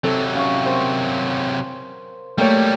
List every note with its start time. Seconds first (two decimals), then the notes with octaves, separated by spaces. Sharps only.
0.04 C3 F#3 C4 A4
0.35 C#4 F5 C#6
0.65 A#4 C5
2.38 F#3 G3 A3 A#3 C#5 G5